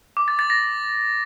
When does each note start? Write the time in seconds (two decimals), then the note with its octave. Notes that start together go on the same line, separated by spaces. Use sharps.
0.17 D6
0.28 A6
0.39 A6
0.50 A#6